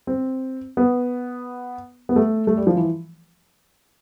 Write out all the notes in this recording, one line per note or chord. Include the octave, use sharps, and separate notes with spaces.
C4
B3
B3
A3
A3
G3
F3
E3